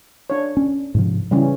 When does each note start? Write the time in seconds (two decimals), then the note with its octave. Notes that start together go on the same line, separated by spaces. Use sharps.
0.30 D4 C#5
0.57 C#4
0.94 G#2 C3 F3
1.31 C#3 E3 G3 C#4